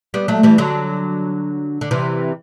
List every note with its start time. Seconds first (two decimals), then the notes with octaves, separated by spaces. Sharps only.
0.14 G3 B3
0.28 F#3 A3
0.43 E3 G3
0.58 D3 F#3
1.81 D3
1.91 C3 E3